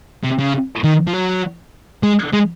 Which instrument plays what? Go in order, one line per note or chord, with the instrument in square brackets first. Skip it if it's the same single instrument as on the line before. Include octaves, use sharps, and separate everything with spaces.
[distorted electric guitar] C3
C#3
D#3
F3
F#3
G#3
G#3